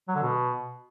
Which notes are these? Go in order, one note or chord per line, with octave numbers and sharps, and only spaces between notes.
F#3
D3
B2